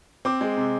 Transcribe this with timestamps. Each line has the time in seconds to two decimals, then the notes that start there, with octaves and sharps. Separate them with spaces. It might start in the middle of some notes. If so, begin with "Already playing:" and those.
0.25 C4 D6
0.41 G#3
0.57 C3